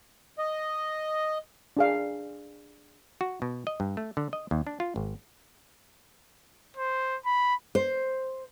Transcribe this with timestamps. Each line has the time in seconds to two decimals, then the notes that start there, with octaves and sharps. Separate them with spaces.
0.39 D#5
1.77 D4 G#4 F5
3.21 F#4
3.42 B2
3.67 D#5
3.80 G2
3.97 A3
4.17 D3
4.33 D#5
4.51 D#2
4.67 D4
4.80 F4
4.96 G#1
6.77 C5
7.26 B5
7.75 C5